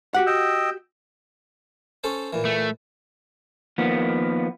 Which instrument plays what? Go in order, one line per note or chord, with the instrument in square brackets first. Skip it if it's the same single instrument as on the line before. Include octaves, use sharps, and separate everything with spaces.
[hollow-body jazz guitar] F#4 G4 F#5
[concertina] D#5 G5 E6
[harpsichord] C#4 A4 C5
A#2 E3
[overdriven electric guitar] A3
[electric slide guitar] D#3 F3 A#3 B3